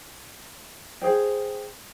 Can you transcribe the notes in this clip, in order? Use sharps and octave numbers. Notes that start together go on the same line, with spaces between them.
G#4 C5 G5